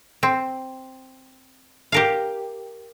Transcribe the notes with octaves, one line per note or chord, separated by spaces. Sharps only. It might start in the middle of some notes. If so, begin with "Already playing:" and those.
C4
G4 A#4 F5